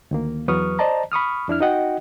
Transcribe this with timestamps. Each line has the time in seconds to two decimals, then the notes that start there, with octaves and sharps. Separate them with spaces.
0.11 D2 D#3 A#3
0.48 E2 F#3 B4 C#6 D#6 F6
0.79 C5 D5 D#5 A5 A#5
1.12 B5 C#6 D#6 F6
1.48 F2 D4 E4 F6
1.60 D#4 F#4 D#5 F#5 G5